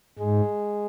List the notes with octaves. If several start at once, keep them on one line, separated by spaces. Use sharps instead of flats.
G#2 G#3